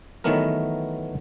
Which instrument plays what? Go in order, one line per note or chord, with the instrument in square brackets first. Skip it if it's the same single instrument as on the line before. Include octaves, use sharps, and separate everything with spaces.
[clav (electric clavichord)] D#3 E3 F#3 A3 B3 A#4